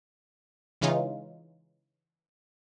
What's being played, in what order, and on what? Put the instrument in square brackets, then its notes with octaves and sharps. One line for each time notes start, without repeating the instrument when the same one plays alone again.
[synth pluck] C#3 E3 G#3 C#4 D#4 F4